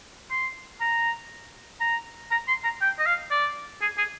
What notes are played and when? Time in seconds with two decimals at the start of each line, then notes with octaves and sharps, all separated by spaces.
0.30 C6
0.80 A#5
1.80 A#5
2.31 A#5
2.48 C6
2.64 A#5
2.81 G5
2.99 D#5
3.06 F5
3.31 D5
3.82 G#4
3.98 G#4